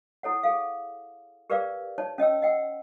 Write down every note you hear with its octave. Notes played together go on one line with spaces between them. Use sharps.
E4 A4 C#5 F#5
G#4 A4 F5
G4 A#4 B4 D5 F5 D6
D#4 C#5 A5
C#4 D#5 G5 E6
D#5 F#5 G5 E6